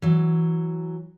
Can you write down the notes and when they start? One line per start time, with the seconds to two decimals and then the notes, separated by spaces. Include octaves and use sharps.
0.02 E3 F#3